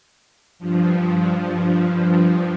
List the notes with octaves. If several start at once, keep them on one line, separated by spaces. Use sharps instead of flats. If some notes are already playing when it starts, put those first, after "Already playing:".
G2 F3